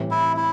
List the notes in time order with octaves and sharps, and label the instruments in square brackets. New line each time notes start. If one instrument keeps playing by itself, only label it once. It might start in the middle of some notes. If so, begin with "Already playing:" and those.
Already playing: [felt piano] A2 E3 G3 C4
[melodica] E4
E4